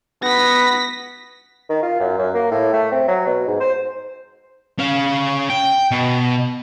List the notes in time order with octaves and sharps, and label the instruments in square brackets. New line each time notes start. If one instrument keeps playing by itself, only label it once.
[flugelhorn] B3 [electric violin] A#6 B6
[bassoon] D#3
F4
F#2
F#2
A#3
A2
A3
C4
F#3
B2
G#2
C5
[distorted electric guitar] C#4 F5
G5
B2